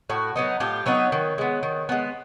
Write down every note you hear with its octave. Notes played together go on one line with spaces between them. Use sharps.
A2 F#4
F#3 B3 D#4
A2 F4 G4
F#3 B3 D#4 B4 C#5
D#3
G#3 B3
D#3
G#3 B3